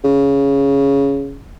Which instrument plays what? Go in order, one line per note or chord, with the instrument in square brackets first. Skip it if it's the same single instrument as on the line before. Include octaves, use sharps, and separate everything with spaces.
[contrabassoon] C#3